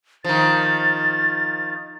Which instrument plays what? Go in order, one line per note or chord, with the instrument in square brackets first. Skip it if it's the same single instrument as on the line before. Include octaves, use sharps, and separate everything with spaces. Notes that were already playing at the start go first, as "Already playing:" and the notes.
[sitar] D#3 F3 [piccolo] A6